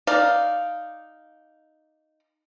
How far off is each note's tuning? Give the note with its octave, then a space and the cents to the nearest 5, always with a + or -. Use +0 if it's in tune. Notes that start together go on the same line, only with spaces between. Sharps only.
D#4 +0 D5 +0 F5 +0